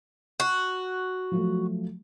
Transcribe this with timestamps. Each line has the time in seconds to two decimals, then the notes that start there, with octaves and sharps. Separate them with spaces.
0.40 F#4
1.31 F3 F#3 A3